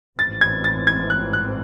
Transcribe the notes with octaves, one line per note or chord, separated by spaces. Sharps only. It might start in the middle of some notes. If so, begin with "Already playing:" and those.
A1 G#2 E3 C4 A6
G#6
A6
G#6
F#6
F#6